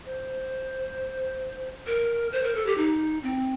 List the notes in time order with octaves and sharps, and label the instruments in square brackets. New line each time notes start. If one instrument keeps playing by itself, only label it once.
[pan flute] C5
A#4
C5
A#4
A4
G4
D#4
C4